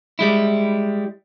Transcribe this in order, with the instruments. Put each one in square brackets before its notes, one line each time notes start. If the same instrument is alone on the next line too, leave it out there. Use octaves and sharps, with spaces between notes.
[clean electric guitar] G3 G#3 E4